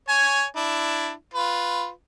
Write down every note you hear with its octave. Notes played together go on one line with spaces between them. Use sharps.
C#5 G#5
D4 E4
F4 B4